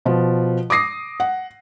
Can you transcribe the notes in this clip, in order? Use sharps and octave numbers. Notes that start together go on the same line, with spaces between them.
B2 F3
D6 D#6 A#6 C7
F#5